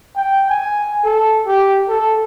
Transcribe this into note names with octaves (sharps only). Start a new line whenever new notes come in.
G5
G#5
A4
G4
A4